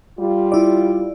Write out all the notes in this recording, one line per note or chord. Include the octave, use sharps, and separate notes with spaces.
G3 F4
E4 D5